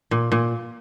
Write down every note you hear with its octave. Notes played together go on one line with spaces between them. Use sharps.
A#2
A#2